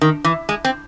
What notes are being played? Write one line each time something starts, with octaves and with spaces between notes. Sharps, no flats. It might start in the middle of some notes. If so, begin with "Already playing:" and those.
D#3
E3
G#3
C4